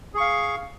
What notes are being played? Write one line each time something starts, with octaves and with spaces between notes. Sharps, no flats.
G#4 F5 C#6